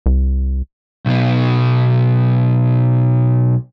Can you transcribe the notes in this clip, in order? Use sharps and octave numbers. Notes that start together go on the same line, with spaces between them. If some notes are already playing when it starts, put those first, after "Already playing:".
C2
B1 B2